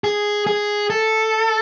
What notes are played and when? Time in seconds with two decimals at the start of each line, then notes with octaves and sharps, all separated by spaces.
0.04 G#4
0.47 G#4
0.90 A4